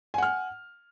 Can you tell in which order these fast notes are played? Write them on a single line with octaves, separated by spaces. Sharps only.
G#5 F#5 F6